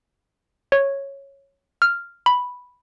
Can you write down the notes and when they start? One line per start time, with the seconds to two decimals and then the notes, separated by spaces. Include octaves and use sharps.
0.72 C#5
1.82 F6
2.26 B5